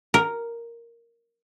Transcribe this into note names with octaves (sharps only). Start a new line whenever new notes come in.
A#4